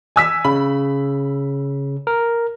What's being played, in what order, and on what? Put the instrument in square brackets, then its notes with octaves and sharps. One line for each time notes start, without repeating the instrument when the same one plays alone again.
[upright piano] G#5 E6 B6
[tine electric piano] C#3 [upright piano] B5
[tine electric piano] A#4